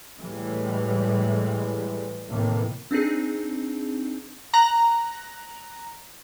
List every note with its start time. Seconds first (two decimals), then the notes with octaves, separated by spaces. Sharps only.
0.19 A2 E3 G3 G#3
2.28 A2 C3 D#3 E3 A#3
2.91 C4 D4 D#4 G#4
4.54 A#5 F#6 A#6